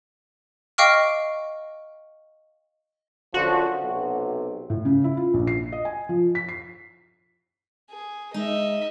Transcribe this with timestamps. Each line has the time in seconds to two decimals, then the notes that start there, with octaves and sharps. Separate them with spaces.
0.78 D#5 F5 G5 C#6 D6 F6
3.34 F#2 D3 F3 F#4
3.82 B1 C3
4.70 A2
4.85 C#3
5.04 E4
5.17 F4
5.34 A#1
5.47 C7
5.72 D#5
5.85 G#5
6.09 F3
6.35 B6
6.49 C7
7.91 G#4
8.34 G#3 D#4 D#5 E5